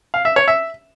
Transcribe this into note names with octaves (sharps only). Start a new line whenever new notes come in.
F5
E5
C#5
E5